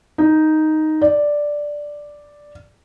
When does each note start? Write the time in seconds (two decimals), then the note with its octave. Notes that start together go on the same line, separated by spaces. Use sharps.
0.18 D#4
1.02 D5